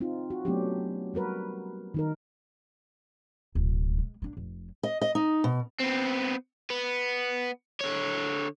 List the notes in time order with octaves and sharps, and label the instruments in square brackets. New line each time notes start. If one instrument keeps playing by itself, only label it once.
[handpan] C4 D#4 F4
F#4
F#3 A3 B3 C#4 D4 G4
G3 F#4 A#4 B4
D#3 D#4 A#4
[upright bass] D1 B2
G#3
A#3 D4
F1
[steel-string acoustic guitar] D#5
D#5
D#4
B2
[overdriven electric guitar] B3 C4
B3
D3 C#5